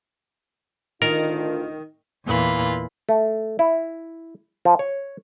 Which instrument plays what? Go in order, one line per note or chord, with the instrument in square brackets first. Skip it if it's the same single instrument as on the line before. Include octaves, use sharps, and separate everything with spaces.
[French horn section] D2 D4 F4 [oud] D#3 [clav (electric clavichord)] A#4
[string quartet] E2 A#2 E3 F4 B5
[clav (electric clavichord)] A3
E4
F3
C#5